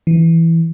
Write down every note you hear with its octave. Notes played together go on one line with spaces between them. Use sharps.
E3